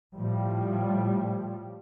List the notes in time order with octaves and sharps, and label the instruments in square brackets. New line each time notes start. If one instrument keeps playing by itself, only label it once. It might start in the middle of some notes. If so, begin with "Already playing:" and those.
[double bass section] A2 F3 G3